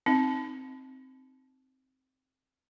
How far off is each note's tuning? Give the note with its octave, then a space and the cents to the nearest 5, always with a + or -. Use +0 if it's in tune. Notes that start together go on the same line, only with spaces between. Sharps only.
C4 +0 D#4 +0